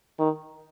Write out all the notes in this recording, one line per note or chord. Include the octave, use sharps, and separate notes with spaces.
D#3